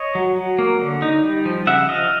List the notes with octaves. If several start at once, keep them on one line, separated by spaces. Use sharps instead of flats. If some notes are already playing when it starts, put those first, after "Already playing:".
Already playing: C#5 D#5
F#3
F#3
A#3
D3
D#4
G3
F3
C#3 E5 F#5
F3 D#5 F5